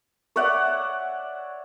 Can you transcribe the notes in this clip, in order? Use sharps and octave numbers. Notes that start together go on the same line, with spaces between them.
C#5 D5 E5 F#5